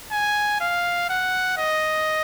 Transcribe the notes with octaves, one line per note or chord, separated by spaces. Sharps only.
G#5
F5
F#5
D#5